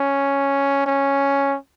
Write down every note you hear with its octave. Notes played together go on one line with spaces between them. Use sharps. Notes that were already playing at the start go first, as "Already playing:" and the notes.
Already playing: C#4
C#4